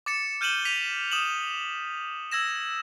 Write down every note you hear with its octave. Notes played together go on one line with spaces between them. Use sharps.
D6 A6 C#7 E7
F6 G6 D#7 E7 F#7 G7
B6 D#7 F7
D#6 E7 F#7
E6 G#6 A#6 E7